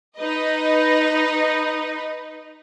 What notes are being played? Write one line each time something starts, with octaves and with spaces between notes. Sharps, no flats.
D#4 B4 D#5